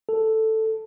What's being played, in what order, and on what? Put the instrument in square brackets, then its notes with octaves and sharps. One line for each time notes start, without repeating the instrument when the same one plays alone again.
[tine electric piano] A4